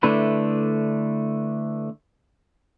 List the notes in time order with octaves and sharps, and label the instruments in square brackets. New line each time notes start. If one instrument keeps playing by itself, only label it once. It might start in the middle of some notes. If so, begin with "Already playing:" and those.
[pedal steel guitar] D3 A3 D4 E4 B4